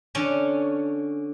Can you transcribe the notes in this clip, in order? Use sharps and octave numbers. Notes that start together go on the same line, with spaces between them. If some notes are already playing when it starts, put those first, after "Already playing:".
D3 C#4